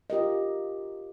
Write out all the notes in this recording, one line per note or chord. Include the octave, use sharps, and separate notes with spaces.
F4 G4 A#4 D#5